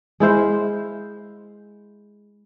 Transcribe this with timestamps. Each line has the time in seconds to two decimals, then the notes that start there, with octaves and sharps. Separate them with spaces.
0.20 G#3 E4 C5 F5